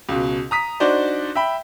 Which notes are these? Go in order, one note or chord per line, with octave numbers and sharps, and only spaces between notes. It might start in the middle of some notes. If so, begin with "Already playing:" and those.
C#2 B2
A#5 D#6 B6
D4 D#4 F#4 C5 D5
E5 G5 B5